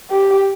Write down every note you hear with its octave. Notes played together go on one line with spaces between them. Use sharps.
G4